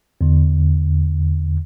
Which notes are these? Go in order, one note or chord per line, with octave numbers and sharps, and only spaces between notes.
E2 D3